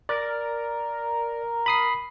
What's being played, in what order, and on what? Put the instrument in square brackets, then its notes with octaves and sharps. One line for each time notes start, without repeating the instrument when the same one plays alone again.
[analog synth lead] A#4 [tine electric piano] D5
[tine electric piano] B5 D#6 C7